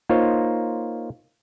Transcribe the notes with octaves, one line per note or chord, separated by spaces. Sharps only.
A#3 D#4 F4 C5 C#5